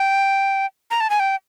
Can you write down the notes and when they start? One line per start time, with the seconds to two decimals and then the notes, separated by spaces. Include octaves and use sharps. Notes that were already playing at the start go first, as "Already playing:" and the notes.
Already playing: G5
0.91 A#5
1.00 A5
1.10 G#5
1.20 G5